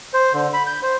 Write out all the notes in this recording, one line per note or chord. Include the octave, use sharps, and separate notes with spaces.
C5
D3
B5
G6
C5